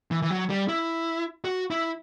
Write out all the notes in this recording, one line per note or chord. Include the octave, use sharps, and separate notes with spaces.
E3
E3
F#3
G3
E4
F#4
E4